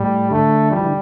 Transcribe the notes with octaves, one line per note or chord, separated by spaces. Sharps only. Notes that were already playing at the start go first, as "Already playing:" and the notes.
Already playing: A2 G3
D3 A3
F3 G3
E3
D3